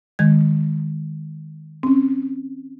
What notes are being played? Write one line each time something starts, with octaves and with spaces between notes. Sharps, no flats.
D#3 G#3 G#6
C4 C#4